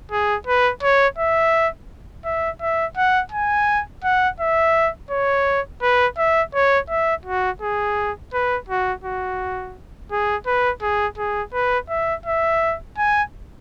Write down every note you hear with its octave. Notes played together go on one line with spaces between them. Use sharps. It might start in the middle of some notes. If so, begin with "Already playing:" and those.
G#4
B4
C#5
E5
E5
E5
F#5
G#5
F#5
E5
C#5
B4
E5
C#5
E5
F#4
G#4
B4
F#4
F#4
G#4
B4
G#4
G#4
B4
E5
E5
G#5